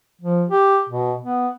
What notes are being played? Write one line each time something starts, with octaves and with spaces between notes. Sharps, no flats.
F3
G4
B2
B3